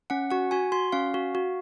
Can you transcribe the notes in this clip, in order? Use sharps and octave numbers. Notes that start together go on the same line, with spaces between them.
C#4 F#5
F#4 F#5
F#4 G#5
F#4 C6
C#4 F5
F#4
F#4